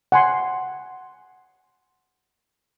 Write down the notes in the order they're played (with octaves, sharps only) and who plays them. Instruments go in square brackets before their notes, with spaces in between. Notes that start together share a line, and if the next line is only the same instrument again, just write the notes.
[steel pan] F#5 G#5 C6